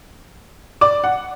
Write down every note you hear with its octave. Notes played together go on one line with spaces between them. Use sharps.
D5 D6
F#5